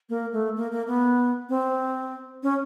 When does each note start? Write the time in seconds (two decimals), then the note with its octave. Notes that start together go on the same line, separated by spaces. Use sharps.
0.09 A#3
0.32 A3
0.56 A#3
0.71 A#3
0.87 B3
1.49 C4
2.43 C#4